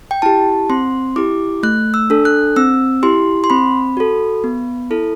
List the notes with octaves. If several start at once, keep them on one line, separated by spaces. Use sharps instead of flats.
G5
E4 G4 A5
C4 C6
E4 G4 D6
A3 F#6
E6
D4 A4
F#6
C4 E6
E4 G4 C6
C6
C4 B5
F#4 A4
B3
E4 A4